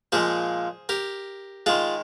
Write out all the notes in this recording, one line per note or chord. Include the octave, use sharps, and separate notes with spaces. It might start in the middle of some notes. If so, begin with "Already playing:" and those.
A#2 F3 G#3 G#4 C5
G4 A#4
D#3 G#3 F4 G#4